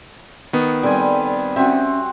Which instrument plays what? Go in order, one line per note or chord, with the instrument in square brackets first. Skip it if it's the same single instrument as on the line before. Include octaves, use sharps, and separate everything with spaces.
[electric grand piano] D#3 B3
[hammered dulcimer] G3 C4 G#5 [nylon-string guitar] A4 D5
[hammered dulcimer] C4 F#4 [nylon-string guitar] C#4 E5